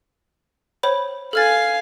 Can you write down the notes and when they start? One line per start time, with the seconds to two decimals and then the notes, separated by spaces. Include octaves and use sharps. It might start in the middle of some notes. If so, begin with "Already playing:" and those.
0.83 C5 C#5 B5
1.33 A4 F5 G#5 F6 A6